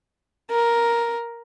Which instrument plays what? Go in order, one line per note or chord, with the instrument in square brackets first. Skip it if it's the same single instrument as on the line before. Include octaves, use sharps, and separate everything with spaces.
[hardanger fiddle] A#4